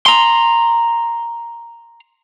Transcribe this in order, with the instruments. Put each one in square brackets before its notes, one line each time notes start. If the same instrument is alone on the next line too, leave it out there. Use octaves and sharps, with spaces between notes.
[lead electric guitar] A#5 C6